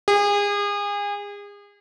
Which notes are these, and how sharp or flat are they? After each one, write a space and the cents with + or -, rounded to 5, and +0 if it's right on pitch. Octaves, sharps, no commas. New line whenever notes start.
G#4 -35